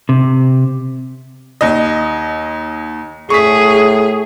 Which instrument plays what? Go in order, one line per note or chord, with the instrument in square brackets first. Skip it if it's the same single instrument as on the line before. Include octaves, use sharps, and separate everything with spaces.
[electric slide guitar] C3
[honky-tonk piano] D#2 D#5
[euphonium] A2 [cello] G#4 [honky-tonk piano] C#6 B6